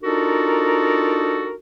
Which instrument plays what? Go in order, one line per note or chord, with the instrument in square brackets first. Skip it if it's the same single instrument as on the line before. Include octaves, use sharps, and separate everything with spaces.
[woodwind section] D4 D#4 F4 F#4 A4 A#4